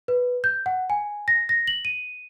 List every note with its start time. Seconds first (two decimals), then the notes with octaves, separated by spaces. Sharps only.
0.08 B4
0.44 G6
0.66 F#5
0.90 G#5
1.28 A#6
1.49 A#6
1.67 F#7
1.85 D#7